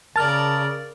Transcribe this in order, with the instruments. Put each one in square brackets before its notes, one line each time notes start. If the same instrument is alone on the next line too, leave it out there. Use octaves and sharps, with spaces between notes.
[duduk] C#3 [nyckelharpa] A#4 D5 [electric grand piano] A5 [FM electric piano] F6 A6